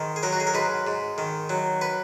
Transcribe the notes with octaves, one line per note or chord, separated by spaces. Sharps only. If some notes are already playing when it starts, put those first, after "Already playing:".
Already playing: G#2 D#3
G#4
F#3 A#4
F#4
G#4
A#4
G#2 B4
G#2
D#3
F#3
B4